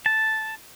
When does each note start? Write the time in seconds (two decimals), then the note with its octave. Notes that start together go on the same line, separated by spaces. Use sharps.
0.06 A5